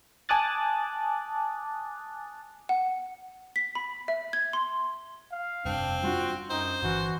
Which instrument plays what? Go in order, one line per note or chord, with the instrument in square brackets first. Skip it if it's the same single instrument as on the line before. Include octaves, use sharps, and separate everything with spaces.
[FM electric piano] G#5 A5 D6 D#6 F#6 A6
[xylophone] F#5
B6
B5
E5
G#6
C6
[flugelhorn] F5
[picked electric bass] F1 G2 [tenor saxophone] C4 [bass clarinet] D4
[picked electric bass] G3 A#3 D4 [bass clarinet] F4 [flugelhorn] F#4
[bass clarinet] F#2 [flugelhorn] D#4 [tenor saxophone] C5
[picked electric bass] G1 [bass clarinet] E3 [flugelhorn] F#4